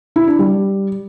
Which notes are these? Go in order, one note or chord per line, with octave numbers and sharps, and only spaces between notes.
E4
D4
G3